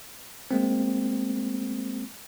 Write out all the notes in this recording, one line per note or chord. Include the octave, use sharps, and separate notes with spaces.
G#3 A#3 C4